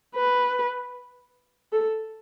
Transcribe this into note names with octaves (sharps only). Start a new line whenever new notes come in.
B4
A4